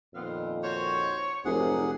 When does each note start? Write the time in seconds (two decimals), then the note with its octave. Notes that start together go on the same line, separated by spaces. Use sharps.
0.14 F2 A#2 D#3 B3 C4 F5
0.63 F#4 C5 C#5 C#6
1.45 F1 G#2 C3 F#3 G#4 A#4 F#5